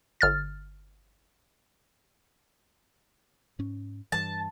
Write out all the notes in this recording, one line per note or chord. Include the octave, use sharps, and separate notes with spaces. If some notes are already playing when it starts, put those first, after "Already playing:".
G1 F6 A6
G#2 C#4
G2 E3 A5